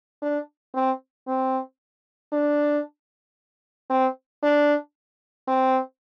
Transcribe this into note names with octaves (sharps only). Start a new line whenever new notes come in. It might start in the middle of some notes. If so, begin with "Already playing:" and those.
D4
C4
C4
D4
C4
D4
C4